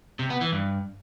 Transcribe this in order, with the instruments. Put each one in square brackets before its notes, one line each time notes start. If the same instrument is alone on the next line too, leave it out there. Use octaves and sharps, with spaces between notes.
[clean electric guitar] C3
B3
E3
G2